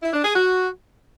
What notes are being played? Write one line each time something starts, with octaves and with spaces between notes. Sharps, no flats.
E4
D4
G#4
F#4